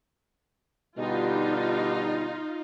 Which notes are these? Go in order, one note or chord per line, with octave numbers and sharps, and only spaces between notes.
B2 D3 G3 D#4 F4